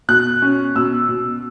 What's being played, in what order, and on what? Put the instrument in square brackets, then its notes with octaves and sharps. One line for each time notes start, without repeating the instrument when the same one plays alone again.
[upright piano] B2 F#6
C#4
B2 E6
B2